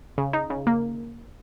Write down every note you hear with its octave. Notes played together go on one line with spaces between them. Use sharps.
C#3
D#4
C#3
A#3